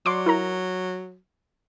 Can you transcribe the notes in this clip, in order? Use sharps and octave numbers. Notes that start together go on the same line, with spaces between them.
F#3 D5 C6 D6
E4 A#4 A#5